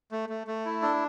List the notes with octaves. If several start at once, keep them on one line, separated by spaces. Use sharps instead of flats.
A3
A3
A3
E4
D4 A4